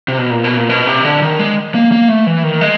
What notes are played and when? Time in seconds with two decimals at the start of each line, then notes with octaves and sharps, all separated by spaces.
0.08 C3
0.18 B2
0.31 A#2
0.44 B2
0.57 A#2
0.69 B2
0.87 C3
1.05 D3
1.22 D#3
1.39 G#3
1.75 A#3
1.92 A#3
2.08 A3
2.27 E3
2.43 D#3
2.61 G#3